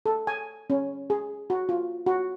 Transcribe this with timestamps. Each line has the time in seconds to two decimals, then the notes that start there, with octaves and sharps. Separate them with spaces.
0.06 A4
0.27 G#5
0.70 C#4
1.10 G#4
1.50 F#4
1.69 F4
2.06 F#4